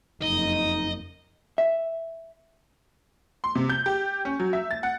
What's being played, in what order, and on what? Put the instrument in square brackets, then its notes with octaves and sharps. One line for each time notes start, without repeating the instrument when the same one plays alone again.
[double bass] F#1 F2 [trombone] D#4 [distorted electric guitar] D#5
[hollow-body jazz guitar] E5
[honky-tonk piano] C6
C3
G6
G4
C#4
F#3
E5
A6
F#5